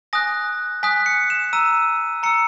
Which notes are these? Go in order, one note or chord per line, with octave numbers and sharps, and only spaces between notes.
G#5 D#6 F#6 A#6
G#5 D#6 F#6 B6
C#7
E7
A#5 E6 D#7
A#5 E6 C#7